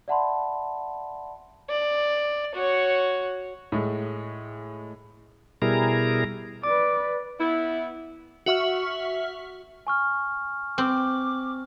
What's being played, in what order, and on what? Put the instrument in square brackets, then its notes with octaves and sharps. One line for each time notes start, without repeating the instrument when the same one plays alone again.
[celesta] D5 E5 F#5 A5 B5 C6
[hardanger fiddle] D5
F#4 C#5
[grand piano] A2 G#3
[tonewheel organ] B2 G3 E4 G#4 A#4 A#5
[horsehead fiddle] B4 D5 [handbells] D6
[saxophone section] B3 E4
[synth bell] F#4 E5 C#6 F6
[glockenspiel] G#5 C#6 F6
[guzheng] C4 [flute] D6